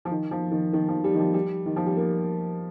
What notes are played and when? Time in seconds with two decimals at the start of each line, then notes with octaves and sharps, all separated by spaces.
0.05 F3
0.11 D#3
0.31 F3
0.51 D#3
0.73 D#3
0.88 F3
1.04 G3
1.14 D#3
1.20 F3
1.34 G3
1.66 D#3
1.76 F3
1.86 G3
1.97 A#3